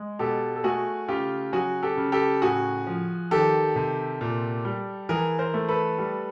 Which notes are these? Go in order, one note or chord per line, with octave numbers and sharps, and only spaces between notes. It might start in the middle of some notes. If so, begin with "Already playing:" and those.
Already playing: G#3
B2 G4 A4
A4
A3 F#4 G#4
C#3 F4 G4
F#3 F#4 G#4
G4 A4
C#3
G4 A4
A2 F#4 G#4
F3
D#3 G4 A4
C3
A#2
G3
E3 G#4 A#4
A#4 C5
A3
A4 B4
G3